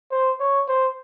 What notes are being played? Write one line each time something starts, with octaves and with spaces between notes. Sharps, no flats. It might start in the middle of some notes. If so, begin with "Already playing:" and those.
C5
C#5
C5